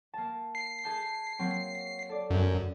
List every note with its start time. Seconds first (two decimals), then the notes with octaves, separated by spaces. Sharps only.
0.14 A#3 A5
0.55 C7
0.84 G#4 A5 G6
1.39 F#3 A#3 C4
2.09 A4 D5
2.30 F#2